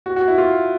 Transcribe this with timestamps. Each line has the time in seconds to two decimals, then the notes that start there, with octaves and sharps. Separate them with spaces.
0.06 F#4
0.16 F#4
0.28 E4
0.38 F4